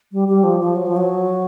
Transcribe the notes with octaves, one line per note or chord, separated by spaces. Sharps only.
G3
G3
F3
F3
F#3
F3
F#3